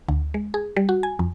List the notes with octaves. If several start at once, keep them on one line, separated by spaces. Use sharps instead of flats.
D2
G#3
G#4
G3
F#4
G#5
F2